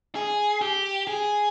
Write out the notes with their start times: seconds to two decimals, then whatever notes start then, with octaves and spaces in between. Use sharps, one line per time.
0.15 G#4
0.61 G4
1.07 G#4